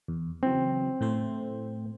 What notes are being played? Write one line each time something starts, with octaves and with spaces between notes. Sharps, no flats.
E2
C#3 E3 F#3 C4
A2 A3 C5